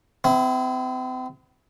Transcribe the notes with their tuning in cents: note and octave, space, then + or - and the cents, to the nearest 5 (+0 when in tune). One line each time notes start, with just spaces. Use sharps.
C4 -40 E4 +0